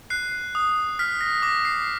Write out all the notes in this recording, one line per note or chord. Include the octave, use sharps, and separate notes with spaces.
F#6 C7
D#6
F6 B6
A#6
D6 A#6
C7